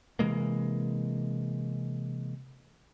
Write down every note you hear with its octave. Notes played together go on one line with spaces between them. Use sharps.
C3 E3 G#3 A#3